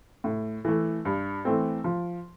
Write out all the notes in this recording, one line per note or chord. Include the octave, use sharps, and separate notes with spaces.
A2
E3 A3
G2
E3 A3 C4
F3